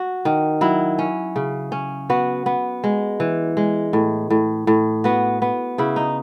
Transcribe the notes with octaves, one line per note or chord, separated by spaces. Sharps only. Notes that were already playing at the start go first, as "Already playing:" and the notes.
Already playing: F#4
D#3
F#3 E4
C#4
C#3
C#4
B3 F#4
B3
G#3
E3
G#3
A2
A2
A2
B3 F#4
B3
C#3 E4
D#4